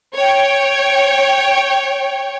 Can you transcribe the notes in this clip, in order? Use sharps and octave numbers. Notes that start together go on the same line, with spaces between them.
C#5 G5